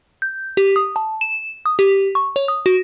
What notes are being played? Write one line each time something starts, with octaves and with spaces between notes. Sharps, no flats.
G6
G4
D#6
A5
E7
D#6
G4
C#6
C#5
D#6
F#4